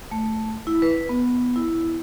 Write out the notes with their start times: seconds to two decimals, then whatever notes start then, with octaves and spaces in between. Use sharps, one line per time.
0.11 A3
0.67 E4
0.82 B4
1.09 B3
1.56 E4